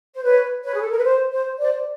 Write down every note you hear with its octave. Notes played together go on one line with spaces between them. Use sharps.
C5
B4 C#5
B4 C#5
G#4
A4
A#4
B4
C5
C5
C5 D5